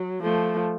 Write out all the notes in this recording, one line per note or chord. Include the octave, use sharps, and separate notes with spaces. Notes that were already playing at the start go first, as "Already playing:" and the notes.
Already playing: F#3
F3 A3